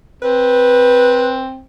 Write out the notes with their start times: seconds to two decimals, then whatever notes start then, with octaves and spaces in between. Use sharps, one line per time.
0.22 C4 B4